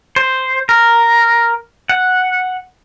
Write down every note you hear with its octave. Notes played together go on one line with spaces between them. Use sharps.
C5
A#4
F#5